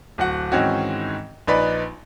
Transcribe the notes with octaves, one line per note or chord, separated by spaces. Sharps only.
D1 F#4 F#5
G#2 D#3 E3 C4 C#4 F#4
A#1 D#4 B4 D5 B5